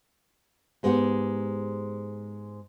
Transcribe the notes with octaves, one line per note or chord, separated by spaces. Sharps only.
G#2 G#3 B3 G4 F#5